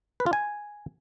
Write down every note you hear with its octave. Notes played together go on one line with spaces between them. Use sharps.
B4
F4
G#5